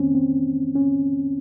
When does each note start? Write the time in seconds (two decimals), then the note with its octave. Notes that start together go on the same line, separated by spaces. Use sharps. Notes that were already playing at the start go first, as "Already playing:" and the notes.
Already playing: F2 D#3 A#3 C4 C#4
0.14 C4
0.75 C#4